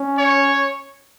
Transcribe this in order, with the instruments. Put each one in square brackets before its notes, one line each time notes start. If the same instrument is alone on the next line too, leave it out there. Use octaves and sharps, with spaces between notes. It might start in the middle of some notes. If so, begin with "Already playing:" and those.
Already playing: [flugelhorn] C#4
[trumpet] C#5